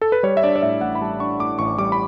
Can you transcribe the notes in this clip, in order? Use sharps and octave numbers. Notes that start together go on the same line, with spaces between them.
A4
B4
G3 C#5
E5
D4 D5
D5
A2 E5
A1 F#5
B5
G3 A5
D4 C#6
A2 D6
A1 C#6
G3 D6
B5